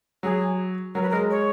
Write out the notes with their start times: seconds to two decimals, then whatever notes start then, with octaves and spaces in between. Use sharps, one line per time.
0.23 F#3 G#4
0.95 F#3 A#4
1.02 B4
1.10 A#4
1.13 G#3
1.30 C#5